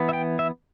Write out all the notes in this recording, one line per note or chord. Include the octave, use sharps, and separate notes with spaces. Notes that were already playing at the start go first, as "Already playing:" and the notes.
Already playing: E3 B3
E5
G5
E5